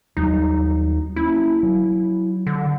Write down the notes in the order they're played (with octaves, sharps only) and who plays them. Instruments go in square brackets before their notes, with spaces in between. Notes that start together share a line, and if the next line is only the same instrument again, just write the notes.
[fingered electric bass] D#2 F#3 G3 [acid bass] D#4
[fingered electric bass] A#3 C#4 [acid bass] E4
[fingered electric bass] F#3
[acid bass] D3